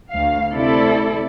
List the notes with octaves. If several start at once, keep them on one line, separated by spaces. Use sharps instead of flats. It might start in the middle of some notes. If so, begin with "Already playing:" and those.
D2 F5
C3 A3 E4 A4 D5